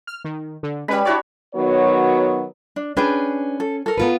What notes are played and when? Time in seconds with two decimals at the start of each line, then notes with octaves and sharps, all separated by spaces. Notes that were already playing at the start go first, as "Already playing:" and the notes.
0.07 F6
0.25 D#3
0.63 D3
0.88 G3 G#3 C#4 B4 B5
1.05 D4 E4 F#4 C#5 D5
1.55 D#3 F#3 B3 F#4 C#5
2.76 D4
2.97 C#4 D4 G#4 B4 G5
3.60 A4
3.86 A4 A#4
3.98 B3 F4 B4